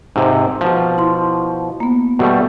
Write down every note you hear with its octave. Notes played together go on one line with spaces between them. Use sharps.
G#2 C3
B2 F3
E4 C6
A#3 B3
B2 G3 A3